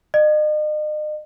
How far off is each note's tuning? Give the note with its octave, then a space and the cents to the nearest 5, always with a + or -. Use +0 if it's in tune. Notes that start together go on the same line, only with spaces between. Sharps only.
D#5 -40